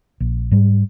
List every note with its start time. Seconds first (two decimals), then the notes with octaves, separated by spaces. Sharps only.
0.20 A#1
0.51 G#2 G3